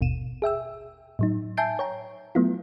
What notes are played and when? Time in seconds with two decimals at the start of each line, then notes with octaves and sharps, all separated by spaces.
0.01 G#1 D#2 B2 D#7 E7
0.42 G#4 E5 G5 E6
1.19 A2 F#3 D#4
1.57 E5 G#5 A5 G6 C7 D7
1.79 C#5 G5 A#5
2.35 F#3 A3 B3 E4 F4